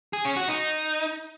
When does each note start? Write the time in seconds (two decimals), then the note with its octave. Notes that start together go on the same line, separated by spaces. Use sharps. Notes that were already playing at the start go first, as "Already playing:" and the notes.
0.13 G#4
0.25 C#4
0.37 F#4
0.48 D#4